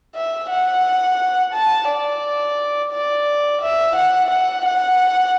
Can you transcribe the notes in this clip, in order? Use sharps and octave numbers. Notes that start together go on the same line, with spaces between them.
E5
F#5
A5
D5
D5
E5
F#5
F#5
F#5